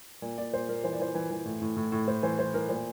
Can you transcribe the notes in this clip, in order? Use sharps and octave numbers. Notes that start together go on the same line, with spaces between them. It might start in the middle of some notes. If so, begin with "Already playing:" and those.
A#2
A#2 D5
A#2 C5
A#2 A#4
E3 C5
D5
E3 C5
E3
E3
A2
A2
A2
A2
A2 C5
E3 C5
E3 C5
E3 A#4
A#2 C5